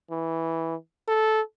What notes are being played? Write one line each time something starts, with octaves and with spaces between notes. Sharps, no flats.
E3
A4